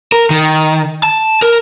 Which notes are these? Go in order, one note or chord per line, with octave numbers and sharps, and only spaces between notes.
A#4
D#3
A5
A#4